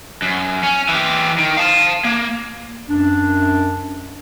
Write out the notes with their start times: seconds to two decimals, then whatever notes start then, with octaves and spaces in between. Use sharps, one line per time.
0.22 F#2
0.63 C#4
0.89 E3 G4
1.38 D#3
1.57 F5 A5
2.05 A#3
2.89 F#2 D4